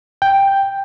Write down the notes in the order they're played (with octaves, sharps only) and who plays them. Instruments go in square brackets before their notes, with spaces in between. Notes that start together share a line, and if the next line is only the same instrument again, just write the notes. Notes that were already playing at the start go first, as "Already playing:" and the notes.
[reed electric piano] G5